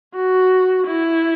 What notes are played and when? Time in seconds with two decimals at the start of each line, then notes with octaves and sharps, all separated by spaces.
0.15 F#4
0.87 E4